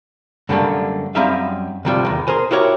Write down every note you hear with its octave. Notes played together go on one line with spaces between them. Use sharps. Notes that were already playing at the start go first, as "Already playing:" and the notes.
F#2 D3 G3 A3 A#3 D4
F#2 G3 C4 D#4 E5 F5
D2 G#2 C3 F3 G3
E2 D#3
G#4 A#4 C5 G#5
E4 F#4 G4 A#4 C#5